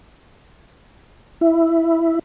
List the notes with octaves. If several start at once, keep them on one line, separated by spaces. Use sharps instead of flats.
E4